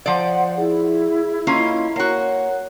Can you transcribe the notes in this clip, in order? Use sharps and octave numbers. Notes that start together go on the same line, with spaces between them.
F3 C5 D5 F#5
E4 G#4
A#3 C#4 F4 D#5 B5
A#3 F#4 A#4 C#5 F#5